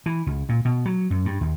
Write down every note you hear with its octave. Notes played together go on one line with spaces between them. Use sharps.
E3
C#2
A#2
B2
F#3
F#2
G2
D#2